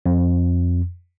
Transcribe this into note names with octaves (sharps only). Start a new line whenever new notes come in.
F2